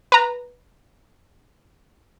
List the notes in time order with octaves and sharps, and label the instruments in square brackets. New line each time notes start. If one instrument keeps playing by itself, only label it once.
[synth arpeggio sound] B4 A#5